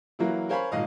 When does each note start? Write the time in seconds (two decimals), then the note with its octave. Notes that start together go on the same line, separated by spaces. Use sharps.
0.19 E3 F#3 A#3 E4
0.49 A#4 C5 C#5 F5 G#5 B5
0.72 G#1 A#2 D#5 F5